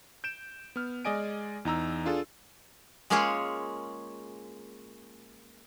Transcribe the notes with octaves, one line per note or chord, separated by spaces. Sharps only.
G6 D7 E7
B3 F6
G#3 G#4 D5 D#5 G#5 D7
E2 D#4 A#5 E6
D4 F4 G#4 A4
G#3 A#3 C#4 F4 G#4 C#5